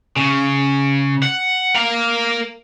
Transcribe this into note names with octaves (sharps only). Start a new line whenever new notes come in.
C#3
F#5
A#4 F5